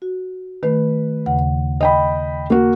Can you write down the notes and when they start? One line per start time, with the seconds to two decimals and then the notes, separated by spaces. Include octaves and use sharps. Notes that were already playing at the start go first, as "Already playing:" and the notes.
0.02 F#4
0.63 D#3 A3 B4
1.26 D#2 C#3 F#5
1.81 D#5 G5 B5
2.50 A#3 F#4